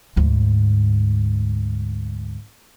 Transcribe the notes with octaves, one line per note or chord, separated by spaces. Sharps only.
D2 G#2